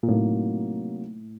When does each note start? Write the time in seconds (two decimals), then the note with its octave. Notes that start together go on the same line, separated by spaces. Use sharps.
0.03 A#2
0.08 A2 C3 F#3 A#3 D#4